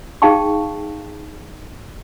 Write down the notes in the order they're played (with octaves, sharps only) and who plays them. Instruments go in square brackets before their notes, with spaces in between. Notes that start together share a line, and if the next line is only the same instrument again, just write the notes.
[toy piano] D#4 G#4 F5 G5 A5 C#6